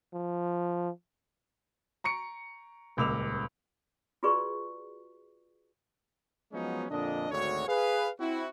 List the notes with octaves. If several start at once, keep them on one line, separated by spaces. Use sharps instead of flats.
F3
A#5 C#6 C#7 D7
D#1 C#2 A#3 D6 E6 F7
F4 F#4 G#4 B4 D5 C#6
F3 F#3 G#3 B3 C#4 D#4
F2 A#2 D3 D4 D#5
G#1 D2 D3 F#4 C#5
G#4 B4 F5
C4 E4 F#4